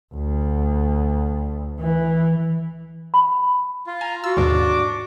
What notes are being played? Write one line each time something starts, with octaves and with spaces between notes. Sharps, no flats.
D2
E3
B5
F4
G#5 A#5
F4 F#4 E6
D#2 G#2 B2 D4 D6